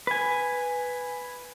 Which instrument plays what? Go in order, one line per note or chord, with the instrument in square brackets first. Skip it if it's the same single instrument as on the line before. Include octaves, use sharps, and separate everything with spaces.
[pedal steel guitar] B4 G#5